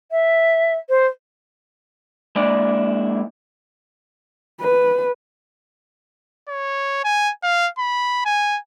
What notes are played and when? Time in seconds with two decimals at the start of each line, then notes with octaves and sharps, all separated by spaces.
0.11 E5
0.89 C5
2.36 G#3 A#3 D4 E4 D5
4.60 B4
6.48 C#5
7.04 G#5
7.43 F5
7.78 B5
8.25 G#5